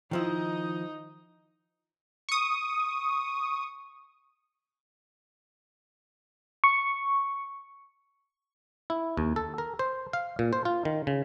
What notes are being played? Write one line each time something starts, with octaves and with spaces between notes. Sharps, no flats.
D#3 F3 D#4 E4 D#5
C#6 D#6
C#6
E4
D#2
A4
A#4
C5
F5
A#2
C5
F4
D#3
C#3